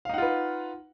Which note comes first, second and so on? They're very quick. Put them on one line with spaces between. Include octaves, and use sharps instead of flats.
F5 D#4 F#5 F4 B4